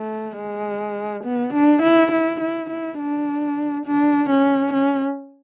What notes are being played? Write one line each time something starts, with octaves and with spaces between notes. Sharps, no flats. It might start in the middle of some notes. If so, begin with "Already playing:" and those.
Already playing: A3
G#3
B3
D4
E4
E4
E4
E4
D4
D4
C#4
C#4